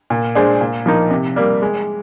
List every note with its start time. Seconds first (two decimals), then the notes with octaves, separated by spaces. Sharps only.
0.10 A#2
0.35 G#3 D4 G#4 C5
0.61 A#2
0.86 F3 A#3 D#4
1.11 C3
1.36 G3 A#3
1.62 G#3